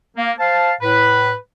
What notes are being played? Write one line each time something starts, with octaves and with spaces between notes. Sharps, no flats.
A#3
C5 F5 A5
A2 B4